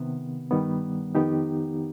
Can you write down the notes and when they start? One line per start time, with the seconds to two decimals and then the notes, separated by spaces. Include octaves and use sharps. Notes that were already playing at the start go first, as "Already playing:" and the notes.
Already playing: C3 D#3 B3
0.51 G2 D#3 G3 B3
1.15 F2 D#3 B3 D#4 G4